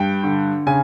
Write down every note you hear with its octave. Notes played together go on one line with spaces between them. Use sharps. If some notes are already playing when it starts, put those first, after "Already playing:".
Already playing: G2 G5
D3
C#3 G#5